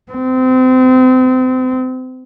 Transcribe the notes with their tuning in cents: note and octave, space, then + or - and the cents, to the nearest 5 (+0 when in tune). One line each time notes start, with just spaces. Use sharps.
C4 -30